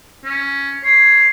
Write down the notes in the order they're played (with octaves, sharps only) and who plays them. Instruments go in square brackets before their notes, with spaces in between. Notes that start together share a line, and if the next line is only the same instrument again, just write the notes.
[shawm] C#4
[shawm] C#5 [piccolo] C7